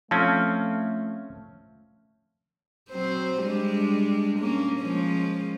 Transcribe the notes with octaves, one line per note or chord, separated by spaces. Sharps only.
F3 A3 C4 C#4 A5 F6
F#3 C4 C5
G3 G#3 D4
A#3 C#4
F3 G#3 C#4